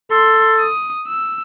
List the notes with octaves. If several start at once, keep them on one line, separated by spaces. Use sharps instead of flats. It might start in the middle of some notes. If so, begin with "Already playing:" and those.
A4 C6
D#6
E6